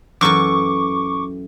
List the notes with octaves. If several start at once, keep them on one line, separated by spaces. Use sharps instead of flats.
F#2 E3 A4 C#6 D6